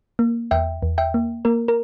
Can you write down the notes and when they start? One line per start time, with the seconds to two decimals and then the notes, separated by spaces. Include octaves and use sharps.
0.19 A#3
0.51 E2 E5 G5
0.83 E2
0.98 E5 G5
1.14 A#3
1.45 A#3 A#4
1.68 A#4